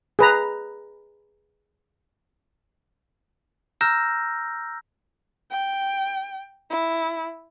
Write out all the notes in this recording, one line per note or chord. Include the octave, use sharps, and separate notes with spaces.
G#4 B4 A#5
A#5 E6 F6 G6 A#6
G5
E4